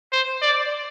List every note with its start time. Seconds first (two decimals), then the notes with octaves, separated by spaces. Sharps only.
0.13 C5
0.42 D5